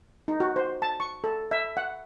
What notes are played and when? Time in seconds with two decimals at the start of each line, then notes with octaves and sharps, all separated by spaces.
0.28 D#4
0.40 F#4
0.56 C5
0.82 A5
1.00 C#6
1.24 A4
1.51 E5
1.77 F#5